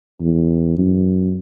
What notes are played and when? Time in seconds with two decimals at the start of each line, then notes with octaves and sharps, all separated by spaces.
0.21 E2
0.78 F#2